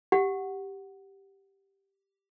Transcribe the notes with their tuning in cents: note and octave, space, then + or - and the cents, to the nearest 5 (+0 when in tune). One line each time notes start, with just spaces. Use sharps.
G4 +0 F#5 +0